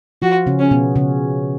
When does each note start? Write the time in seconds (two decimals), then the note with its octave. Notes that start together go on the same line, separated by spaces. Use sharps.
0.22 F3 F4 F#4
0.46 C#3 C#4
0.59 C#4
0.71 B2 B3
0.96 C#3 C#4